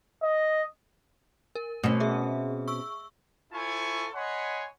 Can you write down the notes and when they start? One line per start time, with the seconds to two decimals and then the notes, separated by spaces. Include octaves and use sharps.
0.23 D#5
1.55 A#4
1.84 B2 A3 C4 C#4
2.00 G#4 E5
2.68 C#6 E6
3.53 E4 F4 A4 C5 G#5 C#6
4.14 C#5 D#5 F#5 G#5 B5 C6